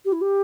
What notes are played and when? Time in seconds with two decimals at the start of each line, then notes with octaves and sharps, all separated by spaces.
0.05 G4
0.12 E4
0.21 G4